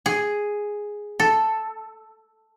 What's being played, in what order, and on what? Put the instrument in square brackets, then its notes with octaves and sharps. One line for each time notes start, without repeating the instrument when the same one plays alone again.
[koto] G#4
A4